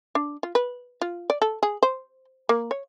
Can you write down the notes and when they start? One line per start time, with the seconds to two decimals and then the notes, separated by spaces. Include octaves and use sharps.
0.15 D4
0.43 F4
0.55 B4
1.01 F4
1.30 D5
1.42 A4
1.63 G#4
1.83 C5
2.49 A#3
2.71 C#5